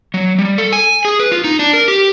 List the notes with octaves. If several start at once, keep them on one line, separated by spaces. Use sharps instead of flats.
F#3
G3
A4
G#5
G#4
B4
F4
D#4
D4
A#4
G4